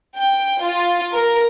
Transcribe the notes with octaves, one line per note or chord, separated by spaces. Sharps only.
G5
F4
A#4